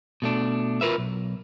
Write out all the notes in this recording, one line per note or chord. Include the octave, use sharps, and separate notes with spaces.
B2 A3 D4
F4 A#4 B4 E5
B1